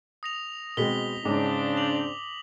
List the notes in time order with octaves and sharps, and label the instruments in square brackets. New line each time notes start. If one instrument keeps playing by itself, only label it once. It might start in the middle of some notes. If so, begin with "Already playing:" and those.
[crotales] D#6 A#6 F7
[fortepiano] B2 G#3 C4 [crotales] B6 G7
[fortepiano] G#2 [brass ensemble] C#3 C4 D4 [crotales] D6
[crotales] F7 F#7